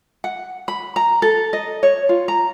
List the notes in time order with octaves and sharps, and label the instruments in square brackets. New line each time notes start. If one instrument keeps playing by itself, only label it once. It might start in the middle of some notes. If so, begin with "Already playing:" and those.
[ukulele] F#5
B5
A#5
A4
D#5
C#5
F4
A#5